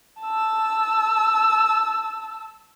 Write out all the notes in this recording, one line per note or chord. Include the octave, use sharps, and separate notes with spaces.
A5 E6